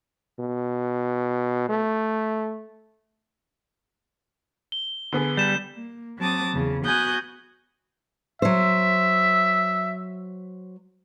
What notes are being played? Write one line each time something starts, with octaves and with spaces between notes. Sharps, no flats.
B2
A3
G7
D3 B3 G#4
G3 G6 E7
A#3
F#3 C4 A5 D6 D#6
E2 C#3
B3 F#4 G#5 D#6 F#6 G6
F#3 C5 E5